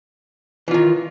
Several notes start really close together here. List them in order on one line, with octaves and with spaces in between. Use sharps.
E3 F4 D#3